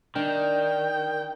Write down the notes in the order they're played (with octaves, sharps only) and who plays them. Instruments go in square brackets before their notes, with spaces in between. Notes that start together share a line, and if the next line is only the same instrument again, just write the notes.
[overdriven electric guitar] D#3 [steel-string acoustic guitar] D4 [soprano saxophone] G5